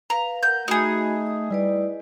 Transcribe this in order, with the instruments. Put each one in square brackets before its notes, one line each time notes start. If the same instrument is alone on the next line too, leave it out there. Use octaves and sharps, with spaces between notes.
[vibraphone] B4 F5 [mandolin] A#5
[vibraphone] A#4 F#5 [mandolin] G6
[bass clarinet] A3 [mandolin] D#4 G#4 [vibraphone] F#4 B5 D#6
[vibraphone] D#6
[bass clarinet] G3 [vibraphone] E4 B4 D5